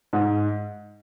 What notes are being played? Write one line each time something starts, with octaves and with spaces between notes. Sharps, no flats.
G#2